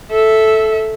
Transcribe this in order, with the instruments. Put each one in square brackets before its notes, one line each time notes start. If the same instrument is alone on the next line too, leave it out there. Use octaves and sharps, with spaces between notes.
[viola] A4 E5